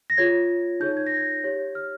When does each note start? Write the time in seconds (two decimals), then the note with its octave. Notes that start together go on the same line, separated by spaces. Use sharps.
0.10 A#6
0.17 F4 G#4 C#5 G#6
0.80 D#4 G#4 C#5 G6
0.97 G#6
1.06 A#6
1.17 G#6
1.44 G4 C#5
1.75 F6